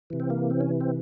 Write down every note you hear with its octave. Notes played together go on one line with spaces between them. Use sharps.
C3 E3
C4
A#3
C4
C#4
C4